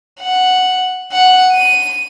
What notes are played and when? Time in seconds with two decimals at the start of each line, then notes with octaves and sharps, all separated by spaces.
0.21 F#5
1.12 F#5
1.53 D#7